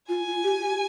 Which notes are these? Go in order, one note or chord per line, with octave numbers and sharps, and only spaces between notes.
F4 G#5
F4
G4
G4